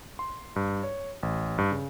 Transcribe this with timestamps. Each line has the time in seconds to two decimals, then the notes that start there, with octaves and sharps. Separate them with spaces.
0.19 C6
0.56 G2
0.83 C#5
1.23 A1
1.58 G2
1.71 C#3